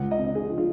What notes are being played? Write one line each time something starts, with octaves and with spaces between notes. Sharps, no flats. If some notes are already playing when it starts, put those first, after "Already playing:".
Already playing: C#2 F#5
D#5
C4
G#4
F3
F4